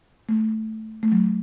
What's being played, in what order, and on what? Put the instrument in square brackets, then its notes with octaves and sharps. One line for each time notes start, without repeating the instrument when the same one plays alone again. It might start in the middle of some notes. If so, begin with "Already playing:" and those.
[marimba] A3
A3
F#3